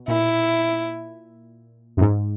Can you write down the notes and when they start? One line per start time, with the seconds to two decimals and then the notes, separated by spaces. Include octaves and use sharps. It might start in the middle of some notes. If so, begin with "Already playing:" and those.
Already playing: B2
0.08 A#2 E4
1.97 F#2
2.01 G#2